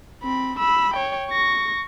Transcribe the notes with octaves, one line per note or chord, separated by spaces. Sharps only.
C4 B5
B5 E6
C#5 G5
C#6 A#6